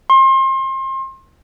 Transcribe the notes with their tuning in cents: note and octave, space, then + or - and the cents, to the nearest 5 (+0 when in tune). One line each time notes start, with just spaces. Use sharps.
C6 +35